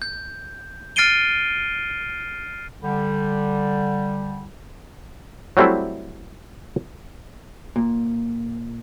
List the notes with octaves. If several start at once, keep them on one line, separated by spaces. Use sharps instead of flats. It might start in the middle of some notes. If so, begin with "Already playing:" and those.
G6
F6 A6 C7 D7 D#7 G7
D3 G3
F#3 G3 A3 C4 E4
A#2